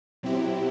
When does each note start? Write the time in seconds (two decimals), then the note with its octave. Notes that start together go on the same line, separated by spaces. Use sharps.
0.23 B2 F#3 C4 E4 G4